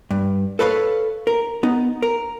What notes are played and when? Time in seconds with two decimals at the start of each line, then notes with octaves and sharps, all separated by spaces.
0.11 G2
0.59 A4 B4 C#5 D5 F5
1.27 A#4
1.63 B3 D#4
2.02 A#4